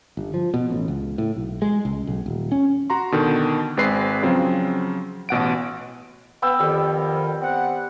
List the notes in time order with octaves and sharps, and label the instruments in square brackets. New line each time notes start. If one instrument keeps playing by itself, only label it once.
[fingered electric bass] G1
F3
B2
A1
C#2
A2
B1
G#3
C#2
B1
D#1
C#4
[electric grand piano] F#4 A#5 C6
B2 D3 D#3
G#1 G#3 C4 B4 C7
C#3 F3 F#3 C4
A1 B2 F#5 D7
[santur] B3 G5 E6
[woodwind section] F2 D#3 [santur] G3
[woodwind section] B3 C4 F#5